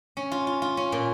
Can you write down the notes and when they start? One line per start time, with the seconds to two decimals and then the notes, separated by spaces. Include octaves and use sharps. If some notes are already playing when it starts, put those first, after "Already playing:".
0.17 C#4
0.32 F4
0.47 F4
0.62 F4
0.77 C#4
0.92 A#2